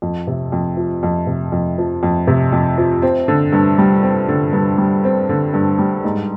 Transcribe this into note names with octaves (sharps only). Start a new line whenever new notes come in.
F2
C3
F2
F3
F2
C3
F2
F3
F2
C3
F2
F3
C4
D3
G2
G3
C4
D3
G2
G3
C4
D3
G2
G3
G#2